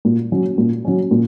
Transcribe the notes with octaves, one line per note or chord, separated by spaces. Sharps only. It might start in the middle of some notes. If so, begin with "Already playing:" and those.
A#2
F#3 C#4
A#2
F#3 C#4
A#2